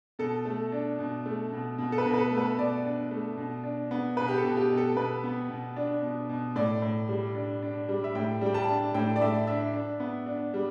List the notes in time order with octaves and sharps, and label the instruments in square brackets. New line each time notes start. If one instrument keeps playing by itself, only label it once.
[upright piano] B2 A4
A3
D4
B2
A3
B2
B2
A4
B4
B2
B4
A4
A3
B4
B2 D5
D4
A3
B2
D4
B3
B2 B4
G4
A4
B2
G4
B2
A4
B2 B4
B3
B2
D4
B2
B2
A2 D5
A2
G3
D4
D4
G3
E5
A2 G5
G3 G5
A5
D4
A2 G5
D5
A2 E5
D4 E5
D4
B3
D4
G3